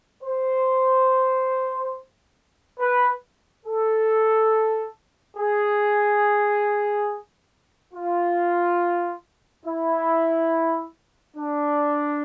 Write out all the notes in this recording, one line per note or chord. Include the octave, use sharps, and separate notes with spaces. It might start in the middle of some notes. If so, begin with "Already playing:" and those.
C5
B4
A4
G#4
F4
E4
D4